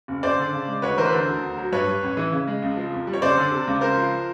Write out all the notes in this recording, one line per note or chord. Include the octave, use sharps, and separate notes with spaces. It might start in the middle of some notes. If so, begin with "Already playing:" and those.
F#1
F#1 C5 D5
D3
C#3
G#3
D2 B4 C#5
E3 A#4 C5
B4
D3 A#4 C5
D2
D2
F#3
G2 B4 C#5
G3
A1
E3
C#3
G#3
C#2
F3
F2
G3
C#5
F#1 C5 D5
D3
C3
C#2
C#2 A#4 C5
F3